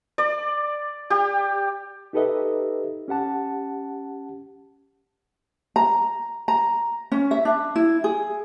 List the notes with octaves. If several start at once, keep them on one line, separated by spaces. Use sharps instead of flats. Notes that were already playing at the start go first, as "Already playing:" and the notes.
D5
G4
D#4 G4 A4 B4 D#5 E5
C#4 G4 F#5 A5
A#5
A#5
C#4
E5
D4
E4
G#4